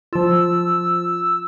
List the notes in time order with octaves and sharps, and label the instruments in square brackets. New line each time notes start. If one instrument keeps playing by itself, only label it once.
[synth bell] F3 F4 [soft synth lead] E6